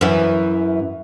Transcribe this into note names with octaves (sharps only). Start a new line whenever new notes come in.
F#2 E3